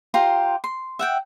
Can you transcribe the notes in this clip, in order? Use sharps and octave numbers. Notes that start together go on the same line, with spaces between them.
F4 G4 C5 A#5
C6
E5 F#5 G5